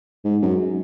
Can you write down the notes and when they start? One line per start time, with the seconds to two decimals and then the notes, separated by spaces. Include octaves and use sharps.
0.24 G#2
0.42 F#2